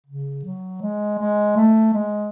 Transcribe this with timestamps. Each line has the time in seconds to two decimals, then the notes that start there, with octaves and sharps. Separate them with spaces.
0.06 C#3
0.44 F#3
0.82 G#3
1.19 G#3
1.56 A3
1.94 G#3